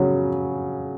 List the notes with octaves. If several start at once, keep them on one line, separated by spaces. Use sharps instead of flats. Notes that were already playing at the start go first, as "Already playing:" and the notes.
Already playing: C#3 F#3